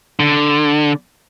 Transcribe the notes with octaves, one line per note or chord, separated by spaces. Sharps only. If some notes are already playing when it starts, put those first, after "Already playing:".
D3